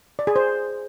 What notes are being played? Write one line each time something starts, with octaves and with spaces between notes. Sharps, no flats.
D5
G#4
C5